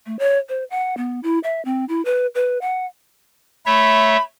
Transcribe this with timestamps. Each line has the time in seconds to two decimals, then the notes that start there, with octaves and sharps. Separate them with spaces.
0.06 A3
0.19 C#5
0.49 C5
0.70 F#5
0.97 B3
1.23 E4
1.43 E5
1.65 C4
1.89 E4
2.05 B4
2.35 B4
2.61 F#5
3.66 A3 C#5 E5 B5